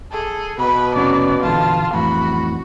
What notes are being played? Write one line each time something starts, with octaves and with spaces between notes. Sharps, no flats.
G#4 A4
B2 B4 B5
F1 F#3 C#4 D5
A#1 E2 D3 F4 A5
F2 A2 E3 F#4 B5